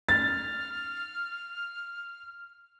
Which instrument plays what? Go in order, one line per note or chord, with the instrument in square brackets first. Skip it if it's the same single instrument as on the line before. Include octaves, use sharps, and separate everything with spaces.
[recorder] F6 [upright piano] A6